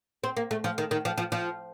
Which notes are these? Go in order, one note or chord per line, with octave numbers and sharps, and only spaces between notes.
C4
A#3
A3
F3
D#3
D#3
F3
F3
F3